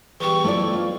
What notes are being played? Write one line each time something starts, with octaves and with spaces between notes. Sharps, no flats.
E2 G3 C#6
B1 F2 A3 E4 D5
F4